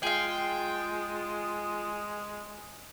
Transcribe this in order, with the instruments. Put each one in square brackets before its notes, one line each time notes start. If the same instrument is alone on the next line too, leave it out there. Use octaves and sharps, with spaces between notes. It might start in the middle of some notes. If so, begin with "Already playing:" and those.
[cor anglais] G#3 [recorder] F4 [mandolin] G#4 F5 [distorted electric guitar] G5